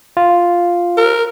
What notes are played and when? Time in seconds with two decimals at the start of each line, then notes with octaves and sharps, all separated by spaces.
0.17 F4
0.97 A#4